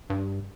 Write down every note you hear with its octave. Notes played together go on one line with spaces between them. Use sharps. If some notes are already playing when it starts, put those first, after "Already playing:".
G2